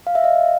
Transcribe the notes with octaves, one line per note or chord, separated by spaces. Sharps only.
F5
E5
D#5 F5